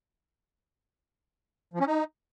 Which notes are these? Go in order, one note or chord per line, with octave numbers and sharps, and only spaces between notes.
F3
C#4
D#4